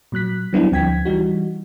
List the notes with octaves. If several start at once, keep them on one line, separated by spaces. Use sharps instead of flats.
A#2 F#3 F#6 B6
F#3 G3 B3 C4 D4 E4
D2 F3 G5 G#6 B6
E3 G3 D#4 F#4